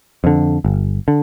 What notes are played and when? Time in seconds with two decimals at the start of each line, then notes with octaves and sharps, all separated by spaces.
0.24 F2 D3
0.65 G1
1.08 D3